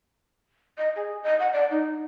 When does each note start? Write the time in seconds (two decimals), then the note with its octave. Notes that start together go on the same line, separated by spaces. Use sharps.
0.78 D#5
0.96 G#4
1.23 D#5
1.40 F#5
1.53 D5
1.71 D#4